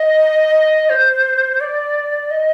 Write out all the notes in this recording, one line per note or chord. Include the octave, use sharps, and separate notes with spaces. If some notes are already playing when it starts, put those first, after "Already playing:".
Already playing: D#5
C5
D5
D#5